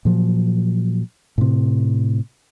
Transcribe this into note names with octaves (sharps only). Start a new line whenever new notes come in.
A#2 F3 F#3
A2 C3